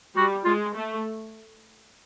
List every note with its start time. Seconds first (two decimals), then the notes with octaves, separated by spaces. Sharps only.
0.16 G3 F#4
0.45 G#3 F4
0.75 A3